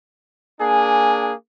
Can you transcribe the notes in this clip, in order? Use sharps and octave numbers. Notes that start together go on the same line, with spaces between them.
A#3 D4 G#4 G#5